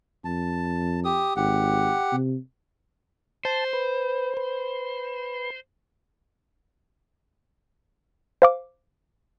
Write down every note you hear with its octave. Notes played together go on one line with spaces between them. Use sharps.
F2 A5
G4 D#6
G#1 G4 F#5
C3
C5 A5
B4
B4
C5 F5 D6